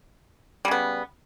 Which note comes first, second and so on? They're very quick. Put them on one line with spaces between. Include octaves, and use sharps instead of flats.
G3 C#3 B3